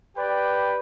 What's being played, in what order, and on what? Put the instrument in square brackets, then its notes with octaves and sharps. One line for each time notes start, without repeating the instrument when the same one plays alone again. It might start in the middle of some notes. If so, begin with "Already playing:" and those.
[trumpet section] G4 B4 D5 G5